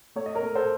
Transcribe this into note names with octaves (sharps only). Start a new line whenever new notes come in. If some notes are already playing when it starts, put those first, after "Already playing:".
A3 C#5
D#5
A#4 C#5
A3
A4 C5